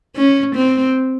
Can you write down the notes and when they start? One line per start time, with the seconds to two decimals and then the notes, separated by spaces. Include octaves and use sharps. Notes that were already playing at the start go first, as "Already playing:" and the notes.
0.16 C#4
0.56 C4